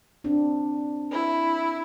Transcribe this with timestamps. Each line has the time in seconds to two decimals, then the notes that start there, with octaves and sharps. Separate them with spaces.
0.24 C4 D4
1.12 E4